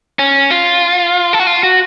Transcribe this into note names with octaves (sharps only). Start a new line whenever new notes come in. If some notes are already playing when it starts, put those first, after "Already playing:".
C#4
F4
A4
F#4
F4
F#4